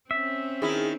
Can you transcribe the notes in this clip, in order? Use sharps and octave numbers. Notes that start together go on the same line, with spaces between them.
C4 C#4 E5
D#3 E4 G#4